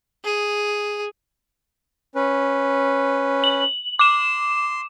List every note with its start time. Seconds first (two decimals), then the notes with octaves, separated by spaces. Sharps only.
0.24 G#4
2.15 C#4 B4
3.44 F#7
3.99 C6 D6 E7